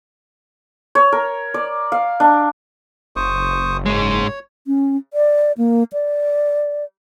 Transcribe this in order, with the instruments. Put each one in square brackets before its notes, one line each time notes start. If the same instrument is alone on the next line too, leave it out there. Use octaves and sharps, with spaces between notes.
[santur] C#5
A#4
D5
F5
D4
[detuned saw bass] F#1 [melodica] C5 C#6 D#6
[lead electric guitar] G#2 G#3 [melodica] C#5
[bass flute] C#4
D5
A#3
D5